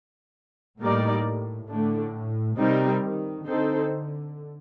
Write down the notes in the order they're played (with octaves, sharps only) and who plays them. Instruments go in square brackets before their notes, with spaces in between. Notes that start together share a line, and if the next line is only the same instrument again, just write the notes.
[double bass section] A2 [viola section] G3 A#3 D#4 A#4 D5
[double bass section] A2 [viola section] D3 A3 D4
[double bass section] C3 [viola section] G3 C4 D#4 A#4
[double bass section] D#3
[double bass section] D3 [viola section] C4 D#4 A4 C5